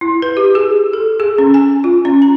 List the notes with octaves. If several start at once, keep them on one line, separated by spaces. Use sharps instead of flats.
E4
B4
G4
G#4
A4
G#4
C#4
G#5
F4
C#4
A#5